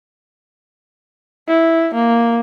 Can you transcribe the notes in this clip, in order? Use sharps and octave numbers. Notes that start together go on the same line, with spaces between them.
E4
A#3